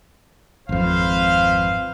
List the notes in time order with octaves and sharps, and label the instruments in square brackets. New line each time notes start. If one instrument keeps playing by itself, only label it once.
[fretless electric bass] G#1 F2 [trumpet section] B4 C5 F5